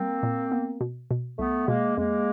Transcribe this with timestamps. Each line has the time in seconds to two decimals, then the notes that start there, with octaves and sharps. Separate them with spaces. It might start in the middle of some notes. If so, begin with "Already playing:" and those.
Already playing: G3 A#3 C4
0.23 A#2
0.52 B3
0.81 B2
1.11 B2
1.39 C2 A3 B3
1.68 B2 G#3 A#3
1.97 F2 G#3 A#3